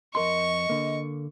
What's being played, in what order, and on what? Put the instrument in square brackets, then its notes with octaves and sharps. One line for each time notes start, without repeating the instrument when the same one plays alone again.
[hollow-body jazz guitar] F2 A#4 C6 [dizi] D#5 [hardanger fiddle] C#6
[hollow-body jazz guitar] D3 A#3